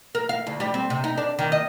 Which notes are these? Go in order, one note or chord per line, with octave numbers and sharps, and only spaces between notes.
A#4
F5
D2
G3
C4
C3
D#4
D4
D#3
D#5